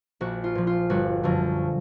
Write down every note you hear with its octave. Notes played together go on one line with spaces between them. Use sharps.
A#1 F#4
F4
A#2 F3
F4
G1 F#4
F#2 D3 F3